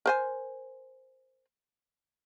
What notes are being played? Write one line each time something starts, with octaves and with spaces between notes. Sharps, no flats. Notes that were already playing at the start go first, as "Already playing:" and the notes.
A#4 C5 G#5